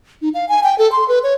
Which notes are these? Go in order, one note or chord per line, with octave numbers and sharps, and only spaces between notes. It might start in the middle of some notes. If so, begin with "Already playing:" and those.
D#4
F5
G#5
G5
A4
C6
B4
C#5